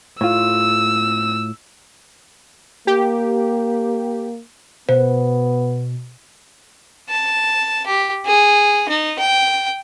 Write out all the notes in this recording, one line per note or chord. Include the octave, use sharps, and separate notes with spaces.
A2 F4 E6
A#3 G4
B2 B3 C5
A5
G4
G#4
D#4
G5